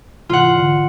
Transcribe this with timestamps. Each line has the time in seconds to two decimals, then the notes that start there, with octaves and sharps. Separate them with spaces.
0.29 G#2 C3 E3 F4 F#5
0.56 D3